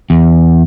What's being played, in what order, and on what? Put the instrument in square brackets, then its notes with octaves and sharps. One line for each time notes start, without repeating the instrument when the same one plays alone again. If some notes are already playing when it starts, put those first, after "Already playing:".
[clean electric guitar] E2